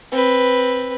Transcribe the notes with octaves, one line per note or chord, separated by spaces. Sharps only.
C4 B4